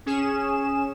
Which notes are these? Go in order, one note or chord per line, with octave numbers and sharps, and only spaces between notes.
C#4 G#4 E7